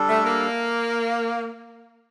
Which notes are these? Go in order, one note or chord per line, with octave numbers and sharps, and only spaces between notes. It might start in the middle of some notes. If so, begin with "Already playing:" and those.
Already playing: G3 D4 A4
A3
A#3